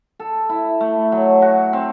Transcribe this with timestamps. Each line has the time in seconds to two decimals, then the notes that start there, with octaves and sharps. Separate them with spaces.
0.19 A4
0.49 E4
0.80 A3
1.12 F#3
1.42 F#4
1.73 C4